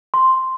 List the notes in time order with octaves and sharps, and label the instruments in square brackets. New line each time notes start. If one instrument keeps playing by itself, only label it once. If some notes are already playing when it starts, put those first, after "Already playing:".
[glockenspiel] C6